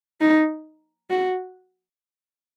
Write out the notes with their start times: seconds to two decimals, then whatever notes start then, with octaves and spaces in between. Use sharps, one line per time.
0.21 D#4
1.10 F#4